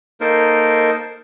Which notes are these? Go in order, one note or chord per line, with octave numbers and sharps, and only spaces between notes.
A#3 D#4 A4 A#4 C5